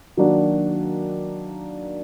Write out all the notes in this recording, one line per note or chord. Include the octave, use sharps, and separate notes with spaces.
D#3 F#3 A#3 D4 F#4